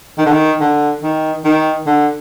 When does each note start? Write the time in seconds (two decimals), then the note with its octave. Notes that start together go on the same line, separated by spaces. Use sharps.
0.18 D#3
0.26 D3
0.33 D#3
0.60 D3
1.03 D#3
1.45 D#3
1.87 D3